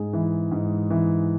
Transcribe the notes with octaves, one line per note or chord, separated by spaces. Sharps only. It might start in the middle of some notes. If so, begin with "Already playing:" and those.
Already playing: G#2 G#4
E3
G#2
E3